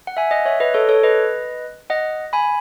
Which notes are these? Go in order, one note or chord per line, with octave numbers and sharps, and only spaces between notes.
F#5
E5 G#5
D#5 F#5
C#5 E5
B4 D#5
A4 C#5
A4 C#5
B4 D#5
D#5 F#5
G#5 B5